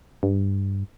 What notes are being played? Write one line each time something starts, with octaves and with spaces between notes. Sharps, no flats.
G2